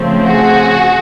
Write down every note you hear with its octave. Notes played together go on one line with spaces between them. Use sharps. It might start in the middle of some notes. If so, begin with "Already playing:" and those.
Already playing: C#3 F3 A3 C4
F#4 G#4